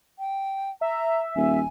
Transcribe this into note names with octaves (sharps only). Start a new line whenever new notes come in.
G5
E5 A#5
D#1 G#5